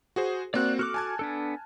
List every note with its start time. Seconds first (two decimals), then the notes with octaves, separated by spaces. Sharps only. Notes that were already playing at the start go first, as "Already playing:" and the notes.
0.16 F#4 G#4 C5
0.54 A#3 C4 F#4 D5 F#6
0.79 F#4 A4 D6 F6 F#6
0.94 G#5 A5 G#6
1.19 B3 D4 A4